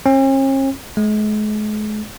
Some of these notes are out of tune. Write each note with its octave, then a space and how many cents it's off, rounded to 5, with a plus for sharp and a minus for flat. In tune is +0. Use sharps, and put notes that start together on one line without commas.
C#4 -45
G#3 +40